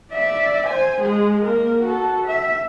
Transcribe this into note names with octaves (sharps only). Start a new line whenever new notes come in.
D5 E5
C5 G#5
G#3 G#4
A#3 A#4
F#4 A4
E5